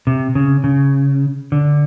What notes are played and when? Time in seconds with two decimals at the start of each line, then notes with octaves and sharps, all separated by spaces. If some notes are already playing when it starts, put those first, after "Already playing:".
0.07 C3
0.35 C#3
0.64 C#3
1.52 D3